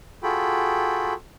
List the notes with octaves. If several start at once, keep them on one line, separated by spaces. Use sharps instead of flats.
F4 F#4 G#4 A4 G5 B5